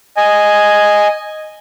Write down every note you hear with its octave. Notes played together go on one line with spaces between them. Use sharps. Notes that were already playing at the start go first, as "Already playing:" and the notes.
D#5 G#5